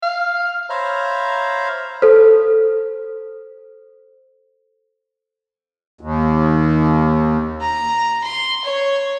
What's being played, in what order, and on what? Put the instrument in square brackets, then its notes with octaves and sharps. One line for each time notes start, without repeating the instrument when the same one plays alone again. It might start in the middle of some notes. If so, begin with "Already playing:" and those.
[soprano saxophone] F5
[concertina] C5 C#5 E5 F5 A#5 B5
[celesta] A4 C5
[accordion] D#2
[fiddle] A#5
C6
C#5